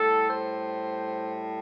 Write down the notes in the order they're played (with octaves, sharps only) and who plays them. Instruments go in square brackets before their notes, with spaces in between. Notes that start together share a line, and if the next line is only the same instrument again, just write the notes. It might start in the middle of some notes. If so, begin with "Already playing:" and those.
Already playing: [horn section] A2 G3 A4
C5